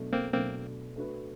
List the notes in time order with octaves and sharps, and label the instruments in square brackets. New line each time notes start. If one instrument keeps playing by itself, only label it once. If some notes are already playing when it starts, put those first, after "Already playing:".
Already playing: [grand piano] B2 F#3 A3 D4
[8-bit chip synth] A#3 C4
[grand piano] B2 F#3 A3 D4 [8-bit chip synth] A#3 C4
[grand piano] A3 D4 F#4 B4